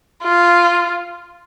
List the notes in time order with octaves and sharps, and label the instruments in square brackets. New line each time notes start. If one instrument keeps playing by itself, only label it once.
[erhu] F4